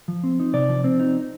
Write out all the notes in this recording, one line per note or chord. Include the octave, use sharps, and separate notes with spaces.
F3
C4
D#4
C3 D5
F3
C4
D#4